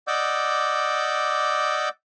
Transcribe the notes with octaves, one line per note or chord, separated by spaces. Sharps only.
D5 D#5 F#5 D6 E6 G6